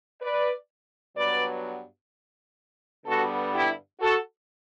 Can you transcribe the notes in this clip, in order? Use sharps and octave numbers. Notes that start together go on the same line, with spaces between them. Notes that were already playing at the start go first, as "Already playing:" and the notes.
B4 D5
G2 F#3 B3 B4 D5
G2 D3 G3 B3 F#4 A4
E4 G4
F#4 A4